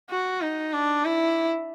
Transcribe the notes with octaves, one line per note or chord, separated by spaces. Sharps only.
F#4
D#4
D4
E4